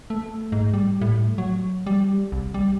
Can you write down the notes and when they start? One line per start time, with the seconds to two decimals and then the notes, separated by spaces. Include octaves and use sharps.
0.10 A3
0.52 G#2
0.74 G3
1.01 A2
1.38 F#3
1.87 G3
2.32 C2
2.54 G3